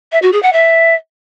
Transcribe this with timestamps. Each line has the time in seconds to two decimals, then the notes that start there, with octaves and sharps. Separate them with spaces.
0.12 E5
0.22 F#4
0.32 G#4
0.43 F#5
0.53 E5